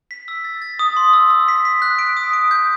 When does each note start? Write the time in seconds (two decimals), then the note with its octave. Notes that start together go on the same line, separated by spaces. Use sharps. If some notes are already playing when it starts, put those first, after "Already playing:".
0.11 B6
0.28 E6
0.44 A6
0.62 A6
0.79 D#6
0.97 C6
1.13 E6
1.30 E6
1.48 B6
1.65 B6
1.82 F#6
1.99 D7
2.17 D#6
2.33 D7
2.51 G6